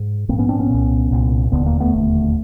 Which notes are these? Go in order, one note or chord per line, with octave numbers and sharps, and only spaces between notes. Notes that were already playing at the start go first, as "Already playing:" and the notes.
Already playing: G#2
A#1 G#2 A#3 C4
B3 C#4
C4 D4
B3 C#4
C2 A#2
C2 A#2
E1 D#2 D3 B3
A#3
A3 B3
E1 D#2 D3